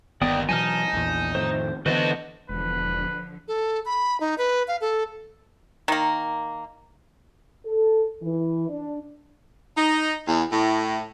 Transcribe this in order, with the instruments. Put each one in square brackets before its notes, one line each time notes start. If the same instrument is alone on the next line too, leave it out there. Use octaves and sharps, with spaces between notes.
[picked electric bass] G1 B3 [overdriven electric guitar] D#2 [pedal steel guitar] D5 G5 D#6
[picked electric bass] B2 E3 F#3 [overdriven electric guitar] D#4 [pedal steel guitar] G#5 A5 F6
[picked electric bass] A#1 E2
[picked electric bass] F2 A2 D#3 [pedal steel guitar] C5
[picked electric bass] D3 E3 B3 [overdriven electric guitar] D4 F#4 [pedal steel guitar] B4 C5 D#5
[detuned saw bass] E1 [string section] D3 F3 [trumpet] B4
[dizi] A4
B5
D#4
B4
F5
A4
[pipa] D#3 A#3
[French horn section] A4
E3
D4
[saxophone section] D#4
E2
A2